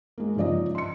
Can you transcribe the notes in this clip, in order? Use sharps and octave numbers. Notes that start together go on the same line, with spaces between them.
G#3 A#3
G#2 C#3 F3 D5 D#5
C6 C#7